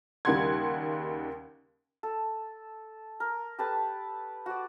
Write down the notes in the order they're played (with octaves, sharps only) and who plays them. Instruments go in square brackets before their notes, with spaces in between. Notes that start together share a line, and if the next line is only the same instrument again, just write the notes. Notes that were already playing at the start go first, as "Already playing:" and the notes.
[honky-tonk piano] D#2 C#3 G3 F#5 C6 G#6
[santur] A4
A#4
G4 A4 B4 A5
F#4 D5